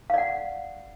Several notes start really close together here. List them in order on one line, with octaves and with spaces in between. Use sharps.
F5 D5 F#5